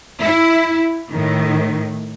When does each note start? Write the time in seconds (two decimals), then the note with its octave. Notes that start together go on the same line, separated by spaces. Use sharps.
0.21 E4
1.13 A2 D#3